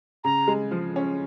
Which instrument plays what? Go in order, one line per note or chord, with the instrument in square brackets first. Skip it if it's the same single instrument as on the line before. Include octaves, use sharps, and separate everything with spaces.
[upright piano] C#3 [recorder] A#5
[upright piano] G#3
F3
C#4